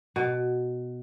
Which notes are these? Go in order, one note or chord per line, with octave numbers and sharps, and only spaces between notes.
B2